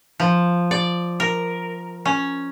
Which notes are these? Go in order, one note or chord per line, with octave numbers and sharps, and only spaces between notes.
F3
D5
A#4
C#4